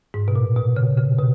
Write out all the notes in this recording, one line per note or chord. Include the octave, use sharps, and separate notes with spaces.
G#2
B2
A#2
B2
C#3
C#3
B2